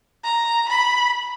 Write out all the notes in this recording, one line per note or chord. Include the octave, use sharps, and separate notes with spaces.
A#5
B5